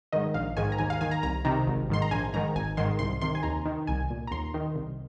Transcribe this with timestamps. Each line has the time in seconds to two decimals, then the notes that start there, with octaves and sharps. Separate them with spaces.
0.13 G#2 D#3 D#5
0.34 A#1 F5
0.57 G#2 D#3 G#5
0.72 A#5
0.78 D#2 G#5
0.90 F5
1.01 D#3 G#5
1.11 A#5
1.23 C2 A#5
1.45 C3 D#3 A#5
1.67 G#1
1.90 G#2 D#3 C6
2.02 A#5
2.11 A#1 G#5
2.34 G#2 D#3 A#5
2.55 G#1 G#5
2.77 G#2 D#3 C6
2.99 C2 C6
3.21 C3 D#3 C6
3.35 G#5
3.43 D#2 A#5
3.65 D#3
3.87 C2 G#5
4.10 A#2
4.27 A#5
4.31 D#2 C6
4.54 D#3
4.75 C2